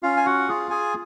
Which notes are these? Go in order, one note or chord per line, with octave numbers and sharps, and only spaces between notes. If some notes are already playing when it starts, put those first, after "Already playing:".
C#4 F4 F5
G#5
F#4 F#5
F4 G#4
G#4 G#5